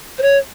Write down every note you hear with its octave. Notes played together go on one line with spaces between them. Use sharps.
C5
C#5